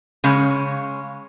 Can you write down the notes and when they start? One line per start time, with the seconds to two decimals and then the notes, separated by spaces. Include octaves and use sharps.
0.24 C#3 G#3 C#4